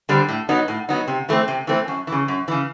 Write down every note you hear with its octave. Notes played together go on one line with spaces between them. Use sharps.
D3 G3 C4
A2
F#3 B3 D#4
A2
F#3 B3 D#4
C3
E3 A3 C4
C3
E3 A3 C4
F#2
E3
C#3
F#2
C#3 E3